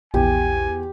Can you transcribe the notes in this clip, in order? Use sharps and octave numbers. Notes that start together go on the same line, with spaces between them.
A#1 E2 G4 G#5